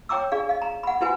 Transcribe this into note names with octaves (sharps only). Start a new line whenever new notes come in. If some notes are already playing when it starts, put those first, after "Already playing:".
C#5 G5 A#5 D6 E6
D4 G#4 D5 F5
D#5 F5
A#5
F#5 B5
E4 F#4 B4 C5 F#5 G#5